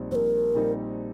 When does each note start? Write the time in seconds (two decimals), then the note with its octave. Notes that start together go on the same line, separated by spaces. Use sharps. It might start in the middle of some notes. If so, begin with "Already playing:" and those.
Already playing: A#1 A#2 G3 C4 D#4
0.11 A#1 C5
0.15 A#4
0.54 A#2 G3 C4 D#4